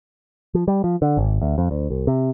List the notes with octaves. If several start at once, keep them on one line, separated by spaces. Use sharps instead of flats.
F3
G3
F3
D3
G#1
D2
F2
D2
C2
C3